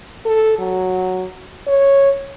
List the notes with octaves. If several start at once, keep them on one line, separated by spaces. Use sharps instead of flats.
A4
F#3
C#5